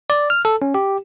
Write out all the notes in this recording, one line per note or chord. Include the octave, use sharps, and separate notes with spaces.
D5
F6
A4
C#4
G4